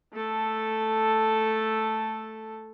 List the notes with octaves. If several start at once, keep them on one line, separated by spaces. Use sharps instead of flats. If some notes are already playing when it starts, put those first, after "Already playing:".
A3 A4